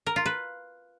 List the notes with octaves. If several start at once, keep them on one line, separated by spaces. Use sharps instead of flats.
A#4
F4
B4